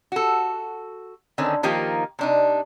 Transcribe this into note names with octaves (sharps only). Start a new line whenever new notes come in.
F#4 A4
D3 D#3 C4 C#4
D#3 F3 A#3 D#4 G4
C3 D4 D#4